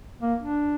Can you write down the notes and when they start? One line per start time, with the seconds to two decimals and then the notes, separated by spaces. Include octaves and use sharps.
0.21 A#3
0.40 D4